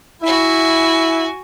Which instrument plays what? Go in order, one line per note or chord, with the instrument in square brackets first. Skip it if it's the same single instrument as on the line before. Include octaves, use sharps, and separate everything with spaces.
[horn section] E4 [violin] F#4 G#5